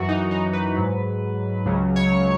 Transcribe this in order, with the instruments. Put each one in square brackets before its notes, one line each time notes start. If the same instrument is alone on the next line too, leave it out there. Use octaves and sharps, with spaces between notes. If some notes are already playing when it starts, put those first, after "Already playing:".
Already playing: [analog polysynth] F#2 E3 F#4
D#4
D#4
B4
G#2 F#3
C#2 C#3 F#3
C#5